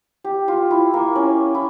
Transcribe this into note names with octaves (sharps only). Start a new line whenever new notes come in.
G4
F4
E4
A#3
C#4
E4